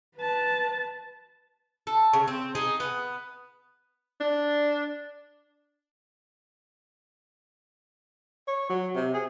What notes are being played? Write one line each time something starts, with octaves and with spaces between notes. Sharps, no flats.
B4 A5
A4
C#3
C4
D#4 G#4
B3
D4
C#5
F#3
C3
G#4